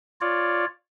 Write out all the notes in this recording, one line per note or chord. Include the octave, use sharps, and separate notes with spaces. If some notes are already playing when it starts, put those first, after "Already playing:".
F4 C#5 D5